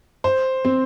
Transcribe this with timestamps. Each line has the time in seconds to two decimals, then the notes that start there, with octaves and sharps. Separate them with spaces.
0.24 C5
0.65 C4